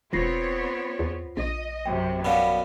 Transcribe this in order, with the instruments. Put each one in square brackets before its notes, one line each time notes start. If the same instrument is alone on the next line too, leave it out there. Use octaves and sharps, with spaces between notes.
[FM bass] E1 [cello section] B3 C4 C#5 [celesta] F4 A#6 C7
[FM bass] E2
[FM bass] A#1 [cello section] D#5
[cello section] F#2 C3 [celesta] G5
[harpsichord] F#2 B2 G3 [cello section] B3 [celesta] F5 B5